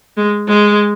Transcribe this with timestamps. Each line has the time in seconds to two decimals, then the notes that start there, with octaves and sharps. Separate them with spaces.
0.17 G#3
0.48 G#3